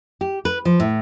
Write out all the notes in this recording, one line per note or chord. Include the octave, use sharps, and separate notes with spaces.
G4
B4
F3
A2